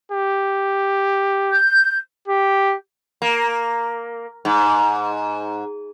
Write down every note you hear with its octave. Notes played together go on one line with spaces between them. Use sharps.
G4
G6
G4
A#3
G#2